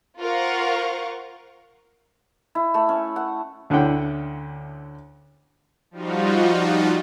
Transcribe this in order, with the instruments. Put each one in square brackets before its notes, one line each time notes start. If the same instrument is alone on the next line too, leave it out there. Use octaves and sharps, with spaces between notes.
[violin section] F4 A#4 C5 F5 F#5 C#6
[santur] E4
A3
C#4
F#5
[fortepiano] D2 D3 C#4 E4 F#5 G5
[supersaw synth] F3 G3 D#4 F4 F#4